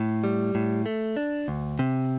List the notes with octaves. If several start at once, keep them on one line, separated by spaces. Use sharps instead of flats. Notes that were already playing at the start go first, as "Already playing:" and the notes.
Already playing: A2
G3
A2
A3
D4
D2
C3